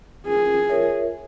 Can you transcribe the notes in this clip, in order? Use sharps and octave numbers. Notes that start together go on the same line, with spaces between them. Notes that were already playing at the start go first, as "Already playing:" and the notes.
C#4 F4 G#4 A#4
F4 A#4 C#5 E5